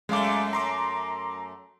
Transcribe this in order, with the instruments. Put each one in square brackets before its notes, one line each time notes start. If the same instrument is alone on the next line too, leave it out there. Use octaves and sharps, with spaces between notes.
[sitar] F#2 A3 [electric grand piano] G#3 F5 D6
[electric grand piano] A#5 C6 D6